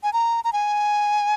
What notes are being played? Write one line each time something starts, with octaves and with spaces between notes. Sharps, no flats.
G#5
A#5
A#5
G#5